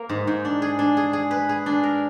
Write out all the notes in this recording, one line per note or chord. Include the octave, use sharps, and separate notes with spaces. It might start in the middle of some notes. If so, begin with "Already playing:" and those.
Already playing: A#3
G#2
G#2
D4
G#4
D4
G#4
G#4
B4
G#4
D4
A#4